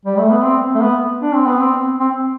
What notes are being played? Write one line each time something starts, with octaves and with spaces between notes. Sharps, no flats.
G3
A3
B3
C4
A3
B3
D4
C4
B3
C4
C4